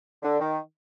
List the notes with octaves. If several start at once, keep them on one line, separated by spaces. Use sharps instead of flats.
D3
D#3